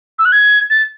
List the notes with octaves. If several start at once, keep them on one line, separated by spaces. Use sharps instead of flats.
E6
F#6
G#6
A6